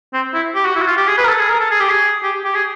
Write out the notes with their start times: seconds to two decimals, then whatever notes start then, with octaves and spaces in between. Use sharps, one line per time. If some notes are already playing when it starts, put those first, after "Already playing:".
0.13 C4
0.34 E4
0.55 G4
0.65 F#4
0.76 E4
0.81 F#4
0.86 F4
0.97 G4
1.07 G#4
1.18 B4
1.24 A#4
1.29 A4
1.39 G#4
1.49 A#4
1.60 A4
1.71 G#4
1.80 G4
1.89 G#4
2.23 G4
2.44 G4
2.54 G#4